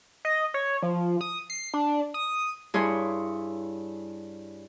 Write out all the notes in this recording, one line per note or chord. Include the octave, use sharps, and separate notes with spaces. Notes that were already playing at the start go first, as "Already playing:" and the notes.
D#5
C#5
F3
D#6
C7
D4
D#6
G2 E4 G#4 C#5 C6